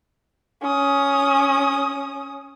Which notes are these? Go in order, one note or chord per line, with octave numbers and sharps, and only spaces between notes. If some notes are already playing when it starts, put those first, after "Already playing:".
C#4 D#6